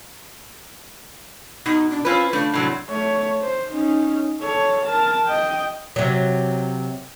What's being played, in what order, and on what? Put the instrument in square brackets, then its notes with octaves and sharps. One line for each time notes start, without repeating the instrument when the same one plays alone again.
[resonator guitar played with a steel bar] B2 [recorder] D#4
[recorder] D4
[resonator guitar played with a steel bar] C4 C#4 B4 [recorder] F4
[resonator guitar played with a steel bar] C#3 A3 [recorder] D4
[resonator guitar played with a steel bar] A2 C3 F#3
[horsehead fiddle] A3 C#5
C5
C#4 D#4
A4 C#5
A#4 A5
D#5 G5
[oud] C3 F#3